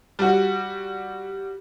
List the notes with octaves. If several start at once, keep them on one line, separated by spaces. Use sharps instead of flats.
G3 F#4